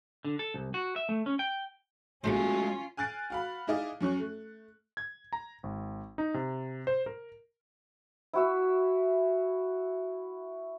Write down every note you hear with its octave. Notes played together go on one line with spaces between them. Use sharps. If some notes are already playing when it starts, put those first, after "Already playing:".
D3
A4
C2
F#4
E5
A3
C#4
G5
D#2 G#2 G#3 A3 C#4 F4 F#4 C5
G#5 F6 F#6 A6 C7 D7
F#4 F5 B5
D#4 E4 G#4 D5 D#5 F5
F#2 C#4 C#6 F#6
A3
G#6
A#5
G#1
D#4
C3
C5
A#4
E4 F#4 E5